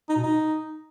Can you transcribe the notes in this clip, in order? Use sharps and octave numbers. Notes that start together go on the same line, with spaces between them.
D#4
B2
D#4